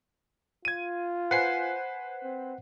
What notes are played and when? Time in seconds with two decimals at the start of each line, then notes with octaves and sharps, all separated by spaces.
0.65 F4 G#6 D#7
1.31 B4 C5 F#5 G#5 C7
2.23 C4